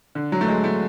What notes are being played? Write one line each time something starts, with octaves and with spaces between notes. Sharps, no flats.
D3
F#3
A3
G#3
A3